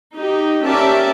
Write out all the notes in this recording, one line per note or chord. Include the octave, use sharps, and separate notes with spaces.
D#4 G4
C#4 G4 A#4 D5 E5 A5